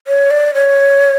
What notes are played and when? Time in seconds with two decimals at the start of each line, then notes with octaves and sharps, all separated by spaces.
0.07 C#5
0.31 D5
0.54 C#5